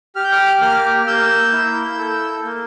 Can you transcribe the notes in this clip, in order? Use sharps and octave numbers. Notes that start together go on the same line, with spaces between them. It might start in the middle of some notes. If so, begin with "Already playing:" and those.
G4 F6
G6
D6 F6
A#3 D6 F6
A#3 E6 G6
E4
A4
A#3